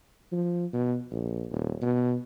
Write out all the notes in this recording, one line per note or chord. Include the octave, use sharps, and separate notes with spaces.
F3
B2
A#1
D#1
B2